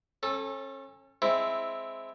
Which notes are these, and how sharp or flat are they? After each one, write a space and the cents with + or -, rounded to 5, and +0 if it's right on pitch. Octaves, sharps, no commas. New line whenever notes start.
C#4 -35 A4 +0
G#3 +0 C4 +0 E4 +0